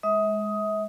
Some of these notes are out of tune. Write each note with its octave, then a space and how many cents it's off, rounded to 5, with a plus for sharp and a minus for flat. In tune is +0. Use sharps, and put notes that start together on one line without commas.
G#3 +0 E5 -40 D#6 +10